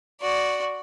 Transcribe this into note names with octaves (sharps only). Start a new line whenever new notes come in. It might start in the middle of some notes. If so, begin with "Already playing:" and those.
F#4 D5